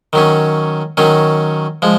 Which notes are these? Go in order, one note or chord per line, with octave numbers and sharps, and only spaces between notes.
D#3 F#3 C#4
D#3 F#3 C#4
F3 G#3